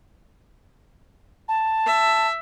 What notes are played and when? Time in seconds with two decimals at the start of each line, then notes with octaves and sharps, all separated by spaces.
1.48 A5
1.86 E5